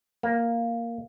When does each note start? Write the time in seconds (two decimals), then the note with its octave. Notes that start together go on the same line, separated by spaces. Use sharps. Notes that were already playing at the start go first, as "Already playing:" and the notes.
0.23 A#3